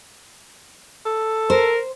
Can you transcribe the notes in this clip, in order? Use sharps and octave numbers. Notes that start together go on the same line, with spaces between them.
A4
A#4 C5